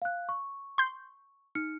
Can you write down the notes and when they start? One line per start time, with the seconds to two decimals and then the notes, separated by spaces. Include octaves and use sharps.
0.02 F5 F#6
0.29 C#6
0.78 C6 G6
1.55 D#4 F6 C#7